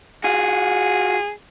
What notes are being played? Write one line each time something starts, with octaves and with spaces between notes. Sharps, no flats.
F4 F#4 G#4